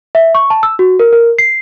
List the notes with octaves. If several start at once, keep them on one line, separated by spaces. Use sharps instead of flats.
E5
C#6
A5
E6
F#4
A#4
A#4
C7